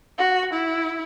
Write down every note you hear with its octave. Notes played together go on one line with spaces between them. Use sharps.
F#4
E4